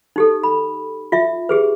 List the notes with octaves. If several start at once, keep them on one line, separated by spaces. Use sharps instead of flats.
D#4 G4 A4
B5
F4 E5
G4 G#4 B4